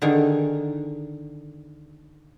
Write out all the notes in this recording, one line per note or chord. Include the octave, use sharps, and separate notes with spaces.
D3 D#3 D#4 G#4